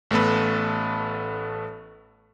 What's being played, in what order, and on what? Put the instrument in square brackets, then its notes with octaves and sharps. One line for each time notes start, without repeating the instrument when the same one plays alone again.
[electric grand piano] A1 A3 B3 A4 B4